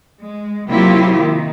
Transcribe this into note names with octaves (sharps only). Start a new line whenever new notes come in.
G#3
C3 F#3 A#3 E4 F4 G4
D#3